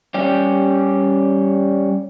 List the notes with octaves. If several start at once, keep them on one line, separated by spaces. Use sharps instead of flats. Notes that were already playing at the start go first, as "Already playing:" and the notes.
G3 C#4 G4